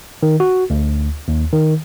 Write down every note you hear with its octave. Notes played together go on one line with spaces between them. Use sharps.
D#3
F#4
D2
D#2
D#3